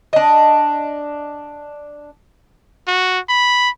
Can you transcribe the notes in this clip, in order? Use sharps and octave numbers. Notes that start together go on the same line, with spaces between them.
D4 D#5
F#4
B5